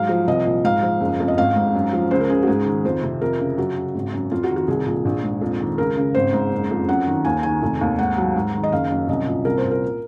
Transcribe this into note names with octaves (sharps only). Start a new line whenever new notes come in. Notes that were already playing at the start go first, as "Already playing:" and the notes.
Already playing: G#2 F#3 F5
F3
C2 D#5
A#2
G#2 F5
F3
F#1
F2
D#5
G#1 F5
G#2
F#2
F3
C#2 C5
A#4
C#3 G#4
F#4
G#2 G#4
D#3
F2 C5
C3
F2 A#4
C#3
F#2 F#4
C#3
G#1
F#2
F2 F4
F#4
D#3
F#4
C2 G#4
A#2
A#1
G#2
F2
D#3
C#2 A#4
C#3
G#1 C5
G#2
F#1
F2
F#2 F#5
D#3
D#2 G#5
D#3 G#5
F1
D#2
G#2 F#5
F#3
G#2
D#3
D#5
F#1 F5
F#2
C2 D#5
A#2
C2 A#4
C5
A#2
A#4